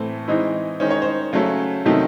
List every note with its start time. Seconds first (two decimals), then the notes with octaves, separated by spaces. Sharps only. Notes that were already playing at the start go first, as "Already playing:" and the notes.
Already playing: A2 E3 A3 C4
0.28 E3 G#3 C4 D#4
0.80 D#3 G#3 C#4 C5
0.91 C#5
1.02 C5
1.33 C#3 F#3 A3 C#4
1.86 C3 D#3 F#3 A3 D#4